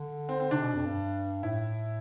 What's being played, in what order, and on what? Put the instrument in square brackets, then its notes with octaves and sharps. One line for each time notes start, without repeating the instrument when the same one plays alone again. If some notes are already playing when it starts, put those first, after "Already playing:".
Already playing: [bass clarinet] D3
[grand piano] C4
C4
[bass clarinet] C3 [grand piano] D4
[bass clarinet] B2
F2
G2
[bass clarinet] A2 [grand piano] E4